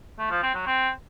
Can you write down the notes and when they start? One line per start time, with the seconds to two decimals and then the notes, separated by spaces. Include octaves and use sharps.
0.18 A3
0.30 F3
0.42 C4
0.54 F#3
0.66 C4